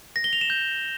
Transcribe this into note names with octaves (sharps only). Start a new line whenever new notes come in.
A#6
G7
F7
E7
G6